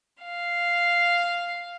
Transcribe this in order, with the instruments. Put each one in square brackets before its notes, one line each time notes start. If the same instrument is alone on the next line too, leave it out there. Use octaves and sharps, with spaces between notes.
[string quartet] F5